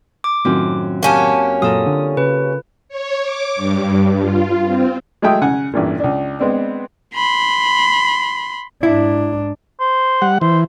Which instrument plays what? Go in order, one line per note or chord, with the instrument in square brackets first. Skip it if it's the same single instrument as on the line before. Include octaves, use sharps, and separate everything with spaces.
[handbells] D6
[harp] F#2 C4 F4 [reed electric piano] A2 D#3 F#3
[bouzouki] A#3 C#4 G4 [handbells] F#5 G#5 A5
[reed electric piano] F#2 A#2 F#3 [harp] F4 A4 A#4 [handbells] D#6
[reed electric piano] D3
[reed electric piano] C#3 [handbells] B4
[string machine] C#5
D6
G2
F4
C4
[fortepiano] F#3 G#3 A3 E5 G5 D#6
C#3 F#5 G#5
A1 G2 A#2
C#2 D4
G#3 B3 C4 D4
[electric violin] B5 C6
[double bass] G#2 D4 [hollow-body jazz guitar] E4
[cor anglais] C5
[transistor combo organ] G3 F#5
[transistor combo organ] E3 [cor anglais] C5